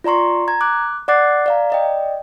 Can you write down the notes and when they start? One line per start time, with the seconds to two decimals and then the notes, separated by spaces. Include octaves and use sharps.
0.04 F4 D5 A#5 C6 C#6
0.48 A#5 G#6
0.61 D6 F#6
1.08 D5 F#5 D6 F#6 A6 C7
1.46 D5 F5 A#5
1.70 D5 D#5 G5